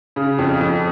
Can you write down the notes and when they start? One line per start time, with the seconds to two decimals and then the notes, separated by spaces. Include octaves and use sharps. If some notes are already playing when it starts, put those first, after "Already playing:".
0.16 C#3
0.38 F2
0.60 F2